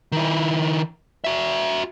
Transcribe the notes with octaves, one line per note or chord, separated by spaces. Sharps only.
D#3 E4
F#4 E5